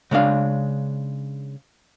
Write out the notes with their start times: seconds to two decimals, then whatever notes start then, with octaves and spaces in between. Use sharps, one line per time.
0.11 C#3 G#3 D4 F5